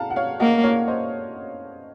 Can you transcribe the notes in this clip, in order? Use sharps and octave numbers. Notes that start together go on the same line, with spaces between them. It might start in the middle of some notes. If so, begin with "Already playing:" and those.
Already playing: F5 F#5 A5 A#5
F#5
C#5 F5
A#3 D#5 F#5
C#5 F5
C5 D#5